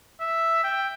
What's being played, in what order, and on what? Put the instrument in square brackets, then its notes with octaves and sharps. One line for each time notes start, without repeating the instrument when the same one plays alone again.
[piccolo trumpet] E5
G5